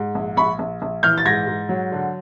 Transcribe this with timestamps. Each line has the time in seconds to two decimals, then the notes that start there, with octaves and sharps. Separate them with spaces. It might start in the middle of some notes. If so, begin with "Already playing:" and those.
Already playing: G#2
0.15 A#1
0.37 A#1 B5 C#6
0.59 A#1
0.82 A#1
1.03 E3 F6 G6
1.18 A6
1.26 G#2 G#6 A#6
1.47 G#2
1.69 F#3
1.92 D3